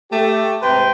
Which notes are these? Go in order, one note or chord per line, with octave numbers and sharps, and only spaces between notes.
A3 G4
G#2 C3 B4 G5 A#5 C6